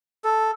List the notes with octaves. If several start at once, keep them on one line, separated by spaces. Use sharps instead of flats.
A4